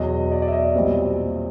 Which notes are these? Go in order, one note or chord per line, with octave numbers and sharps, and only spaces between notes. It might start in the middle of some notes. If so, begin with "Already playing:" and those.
Already playing: E2 B2 F#3 D#5
D5
D5
E5
D#5
D5
B1 A#2 G3 C4